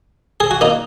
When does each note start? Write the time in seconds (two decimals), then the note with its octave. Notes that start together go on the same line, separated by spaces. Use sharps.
0.40 G#4
0.51 F#4
0.61 A#3 D#4